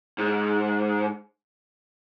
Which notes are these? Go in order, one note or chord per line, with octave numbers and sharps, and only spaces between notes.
G#2